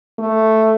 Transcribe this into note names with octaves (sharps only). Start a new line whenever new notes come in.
A3